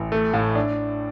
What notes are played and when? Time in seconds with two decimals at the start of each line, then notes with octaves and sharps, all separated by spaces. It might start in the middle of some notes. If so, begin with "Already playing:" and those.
Already playing: A1
0.12 A3
0.33 A2
0.55 D4